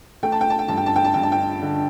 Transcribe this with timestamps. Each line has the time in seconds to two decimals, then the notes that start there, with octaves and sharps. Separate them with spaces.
0.23 A3 G5
0.32 A5
0.41 G5
0.50 A5
0.59 G5
0.68 G2 A5
0.77 G5
0.86 A5
0.96 G5
1.05 A5
1.14 G2 G5
1.23 A5
1.32 G5
1.62 D3